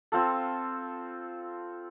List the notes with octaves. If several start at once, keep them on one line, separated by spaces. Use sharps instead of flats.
C4 F4 A4